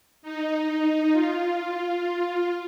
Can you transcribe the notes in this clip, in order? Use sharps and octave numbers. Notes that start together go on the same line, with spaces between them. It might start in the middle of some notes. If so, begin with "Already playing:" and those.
D#4
F4